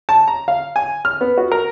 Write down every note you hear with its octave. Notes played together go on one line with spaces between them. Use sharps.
A5
A#5
F5
G#5
F6
B3
F#4
A#4